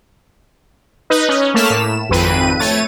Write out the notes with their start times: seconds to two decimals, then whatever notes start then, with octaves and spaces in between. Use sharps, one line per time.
1.10 D#4 B4 D#5
1.29 C#4
1.54 A3 A#3 A5 F6 B6 E7
1.70 A2 E7
2.09 G#1 F2 C4 B4 D#7
2.59 A3 C#5 A6 D#7